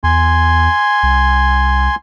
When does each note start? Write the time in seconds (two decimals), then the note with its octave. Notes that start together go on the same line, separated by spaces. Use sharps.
0.04 E2 G#5 C6
1.03 C2